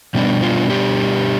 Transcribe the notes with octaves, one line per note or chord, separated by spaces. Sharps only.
B2 G3 B3 D4
F4
G4